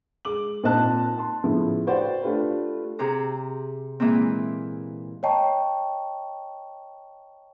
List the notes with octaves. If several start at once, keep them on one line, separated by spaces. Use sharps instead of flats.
G#3 D6 F#7
A#2 C4 D#4 D#5 A5 F#6
A5 C6
A2 C#3 F3 B3 E4
F#4 B4 C5 D5 F#5 G5
A3 D4 F4 G4 B4
C3 G4 G#4 C5 A#5
A#2 E3 G#3 A#3 C4
C#5 D#5 G5 A5 A#5 C#6